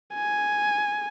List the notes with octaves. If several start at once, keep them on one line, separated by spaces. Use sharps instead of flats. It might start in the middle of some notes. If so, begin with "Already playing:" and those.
G#5